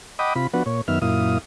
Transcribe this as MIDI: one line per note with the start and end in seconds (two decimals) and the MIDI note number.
0.19 0.34 75
0.19 0.34 78
0.19 0.34 79
0.19 0.34 83
0.19 0.34 86
0.19 0.34 87
0.35 0.47 48
0.35 0.47 65
0.35 0.47 83
0.54 0.63 53
0.54 0.63 59
0.54 0.63 62
0.54 0.63 66
0.54 0.63 71
0.54 0.63 78
0.66 0.81 46
0.66 0.81 73
0.88 0.99 42
0.88 0.99 51
0.88 0.99 59
0.88 0.99 76
0.88 0.99 89
1.02 1.38 42
1.02 1.38 46
1.02 1.38 64
1.02 1.38 77
1.02 1.38 87